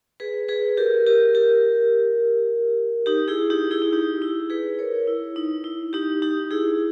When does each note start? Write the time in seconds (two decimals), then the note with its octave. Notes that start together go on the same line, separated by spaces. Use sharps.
0.20 G#4 B4
0.49 G#4 B4
0.77 G4 A#4
1.07 G4 A#4
1.34 G4 A#4
3.06 D#4 G4
3.28 E4 G#4
3.50 D#4 G4
3.71 E4 G#4
3.82 E4
3.93 D#4 G4
4.22 E4
4.50 G#4 B4
4.79 A#4 C#5
5.07 E4
5.36 D#4
5.64 E4
5.93 D#4 G4
6.22 D#4 G4
6.51 E4 G#4